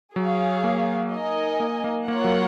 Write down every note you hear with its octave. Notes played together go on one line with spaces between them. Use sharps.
F#3 G#4 C#5 F5
A#3
D#4 A#4 D#5 G#5
A#3
A#3
A#3 F4 A#4 C#5 F#5
F#3